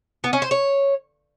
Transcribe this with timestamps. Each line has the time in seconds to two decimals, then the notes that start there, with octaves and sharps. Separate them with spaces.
0.24 B3
0.33 C#4
0.42 C5
0.51 C#5